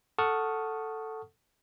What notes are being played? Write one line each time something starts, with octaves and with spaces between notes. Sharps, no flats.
A4 F#5 A5 C#6 D#6 F6